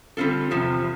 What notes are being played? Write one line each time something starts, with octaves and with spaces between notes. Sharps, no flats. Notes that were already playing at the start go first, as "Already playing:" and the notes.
D3 G3 C4 F4 A4
E2 C3 F3